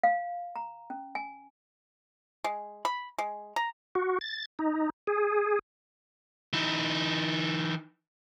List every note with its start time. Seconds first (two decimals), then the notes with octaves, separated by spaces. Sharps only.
0.03 F5
0.56 A#5
0.90 C#4
1.15 G#5
2.44 G#3
2.85 B5
3.18 G#3
3.56 A#5
3.95 F#4
4.21 A6
4.59 D#4
5.07 G#4
6.53 E3 D#4